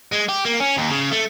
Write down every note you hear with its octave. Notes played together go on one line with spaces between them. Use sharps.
G#3
G4
A#3
C#4
D#2
C#3
A3